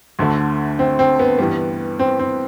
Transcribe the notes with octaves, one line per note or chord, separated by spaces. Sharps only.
D2 D3 A3
C4
C4
B3
G2 E3 G3 B3
C4
C4